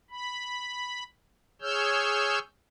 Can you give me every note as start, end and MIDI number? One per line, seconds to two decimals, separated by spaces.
0.11 1.03 83
1.62 2.39 68
1.62 2.39 73
1.62 2.39 88
1.62 2.39 89
1.62 2.39 91